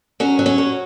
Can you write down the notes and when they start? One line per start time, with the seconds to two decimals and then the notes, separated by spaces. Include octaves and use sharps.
0.20 F#3 C#4
0.39 F#3
0.46 C#4
0.58 F#3